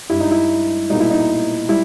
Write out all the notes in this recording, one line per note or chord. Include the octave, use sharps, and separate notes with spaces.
G2 G3 E4
D#4
E4
B1 A#2 G3 D#4
E4
D#4
G3 E4